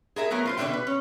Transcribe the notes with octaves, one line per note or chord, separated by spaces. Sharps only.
G#4 A#4 E5 G#5
F#3 A3 B3 A#4
F4 B4 C5
B2 D3 D4 F#4 E5 G5
B4
C#4